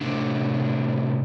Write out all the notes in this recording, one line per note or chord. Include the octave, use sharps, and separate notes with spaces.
A2 C3 D4